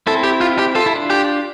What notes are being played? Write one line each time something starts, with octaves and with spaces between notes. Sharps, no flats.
C4 E4 A4
G4
F4
G4
F4 A4
E4
D4 F4
G4